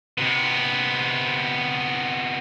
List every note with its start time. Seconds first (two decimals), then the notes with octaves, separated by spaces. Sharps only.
0.18 C3 B3